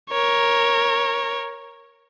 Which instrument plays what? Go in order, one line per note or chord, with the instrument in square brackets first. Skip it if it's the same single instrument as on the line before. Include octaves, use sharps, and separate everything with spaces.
[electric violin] A#4 C#5